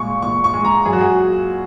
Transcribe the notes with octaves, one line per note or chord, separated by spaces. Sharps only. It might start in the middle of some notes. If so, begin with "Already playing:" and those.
Already playing: A#2 G#3 C#6
A#2 C#6
C#6
G#3
A#5
F#2 G#4
F#4
G#4